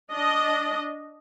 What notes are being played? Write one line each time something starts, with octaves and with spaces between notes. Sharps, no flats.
D4 D#5